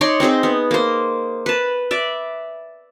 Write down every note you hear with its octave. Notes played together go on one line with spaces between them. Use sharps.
D#4 C#5 D5 C6
C4 D#4 G#4 C5
B3
A#3 C5
B4 A5
D5 E5